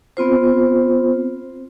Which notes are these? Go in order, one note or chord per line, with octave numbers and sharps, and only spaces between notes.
B3 C4 F4 C5